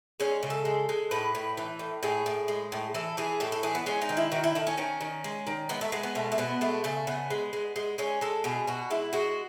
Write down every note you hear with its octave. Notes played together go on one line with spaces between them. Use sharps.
G#3 C#4
C#3
A4
G#3
G#3
A2 B4
A2
E3
A2
A2 G#4
A2
G#3
A2
E3 A4
E3 G#4
A2 A4
A4
E3 G#4
B3
G#3 C#4
D#4
D#3
E4
D#3 F#4
E4
D#3 A4
C#4
D#3 C#4
D#3
G#3
D#3
G#3 B3
A3
G#3 B3
B3
B2 A3
A3
B2 B3
G#3 A3
C#3 A3
C#3 B3
G#3
G#3
G#3
G#3 C#4
G#3 A4
B2 G#4
B2 F#4
G#3 E4
G#3 F#4